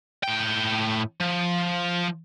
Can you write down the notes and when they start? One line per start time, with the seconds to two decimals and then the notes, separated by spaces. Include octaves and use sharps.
0.23 A2 G5
1.21 F3